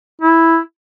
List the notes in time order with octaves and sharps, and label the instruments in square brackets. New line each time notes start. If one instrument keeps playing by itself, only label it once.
[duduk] E4